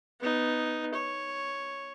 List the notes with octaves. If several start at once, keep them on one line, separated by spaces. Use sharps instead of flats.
B3 D#4
C#5